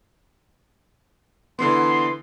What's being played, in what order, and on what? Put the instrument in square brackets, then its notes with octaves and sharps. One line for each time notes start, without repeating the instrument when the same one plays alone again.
[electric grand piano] D3 E3 B3 [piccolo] C6